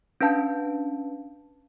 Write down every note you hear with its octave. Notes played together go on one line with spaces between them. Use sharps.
C#4 D4 B4 F5 A5